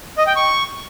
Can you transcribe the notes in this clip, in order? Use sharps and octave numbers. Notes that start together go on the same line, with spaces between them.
D#5
G5
C#6